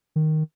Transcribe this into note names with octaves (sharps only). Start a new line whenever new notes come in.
D#3